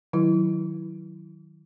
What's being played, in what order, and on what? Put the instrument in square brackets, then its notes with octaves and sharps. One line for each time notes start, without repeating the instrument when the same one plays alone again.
[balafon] D#3 F#3 E4